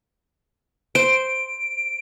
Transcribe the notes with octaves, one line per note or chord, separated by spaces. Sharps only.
C5 D7